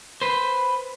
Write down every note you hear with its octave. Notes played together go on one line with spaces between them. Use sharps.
B4 C5